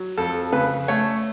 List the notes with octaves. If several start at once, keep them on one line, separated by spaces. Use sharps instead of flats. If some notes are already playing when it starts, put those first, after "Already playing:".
Already playing: F#3
F2 A4
C#3 B4
A3 C#5